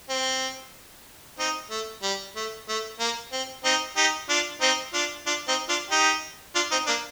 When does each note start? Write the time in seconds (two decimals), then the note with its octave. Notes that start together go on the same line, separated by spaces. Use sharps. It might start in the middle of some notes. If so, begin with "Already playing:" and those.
0.10 C4
1.39 C4 D#4
1.71 A3
2.03 G3
2.36 A3
2.69 A3
3.00 A#3
3.33 C4
3.64 C4 D#4
3.96 D#4 G4
4.29 D4 F4
4.61 C4 D#4
4.93 D4 F4
5.26 D4 F4
5.48 C4 D#4
5.69 D4 F4
5.91 D#4 G4
6.55 D4 F4
6.71 C4 D#4
6.87 A#3 D4